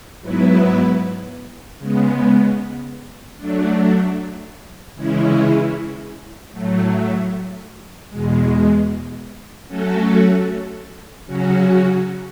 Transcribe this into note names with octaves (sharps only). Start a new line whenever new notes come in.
G#2 F#3 B3 E4 B4
C#3 G#3 B3
F#3 A3 D4
C#3 E3 G#3 C#4 E4
A2 F#3 A3
E2 B2 G#3
F#3 A3 C#4 F#4 A4
C#3 F#3 C#4 F#4